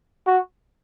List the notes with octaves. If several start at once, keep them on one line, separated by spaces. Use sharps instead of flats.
F#4